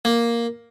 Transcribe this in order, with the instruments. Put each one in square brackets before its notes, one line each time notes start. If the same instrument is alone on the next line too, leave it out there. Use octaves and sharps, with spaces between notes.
[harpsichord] A#3